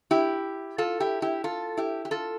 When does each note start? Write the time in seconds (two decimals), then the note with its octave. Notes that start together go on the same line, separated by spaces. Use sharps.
0.11 E4 G4
0.78 F4 A4
1.00 E4 G4
1.22 E4 G4
1.44 F4 A4
1.77 E4 G4
2.05 G4
2.11 F4 A4